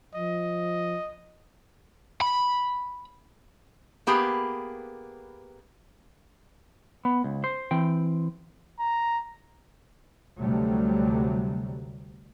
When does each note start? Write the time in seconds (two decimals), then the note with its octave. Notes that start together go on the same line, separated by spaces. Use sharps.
0.15 F3 D#5
2.21 B5
4.07 A#3 B3 G4 G#4 B4
7.05 B3
7.24 C#2
7.44 C5
7.71 E3 C4 G5
8.80 A#5
10.40 D2 C3 F#3 G3 A3